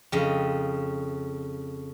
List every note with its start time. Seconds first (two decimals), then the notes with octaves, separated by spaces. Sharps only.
0.12 F2 C#3 D#5